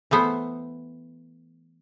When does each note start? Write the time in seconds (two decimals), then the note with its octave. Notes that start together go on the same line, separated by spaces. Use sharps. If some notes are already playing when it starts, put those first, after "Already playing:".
0.11 E3 A3 B3 C5